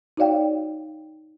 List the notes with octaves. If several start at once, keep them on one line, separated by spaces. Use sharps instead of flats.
D#4 F#4 C#5 D5 F5 G5